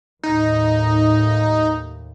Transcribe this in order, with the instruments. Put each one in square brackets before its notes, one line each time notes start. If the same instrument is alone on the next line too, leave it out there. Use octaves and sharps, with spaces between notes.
[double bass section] D#2 A2 [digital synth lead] D#4